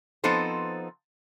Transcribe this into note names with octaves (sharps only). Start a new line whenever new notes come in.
F3 B3 C4 D#4 A4 C5